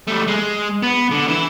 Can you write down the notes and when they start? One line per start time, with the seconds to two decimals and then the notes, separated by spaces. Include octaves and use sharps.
0.08 G3 A3
0.28 G#3
0.83 B3
1.11 D3
1.28 E3 E4